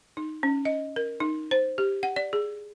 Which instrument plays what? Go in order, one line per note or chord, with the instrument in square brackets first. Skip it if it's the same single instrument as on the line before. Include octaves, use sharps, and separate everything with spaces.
[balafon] D#4
C#4
D#5
A#4
D#4
C5
G4
F#5
D5
G#4